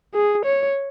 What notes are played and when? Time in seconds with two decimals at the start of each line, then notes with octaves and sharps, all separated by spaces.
0.14 G#4
0.46 C#5